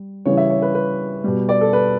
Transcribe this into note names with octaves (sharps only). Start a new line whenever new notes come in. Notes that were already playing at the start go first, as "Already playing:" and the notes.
Already playing: G3
C#3 E3 G3 C#5
E5
C#5
B4
B4
B2 G3
D5
A4
B4